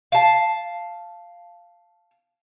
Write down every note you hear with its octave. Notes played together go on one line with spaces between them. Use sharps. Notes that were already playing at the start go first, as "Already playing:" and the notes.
F5 A5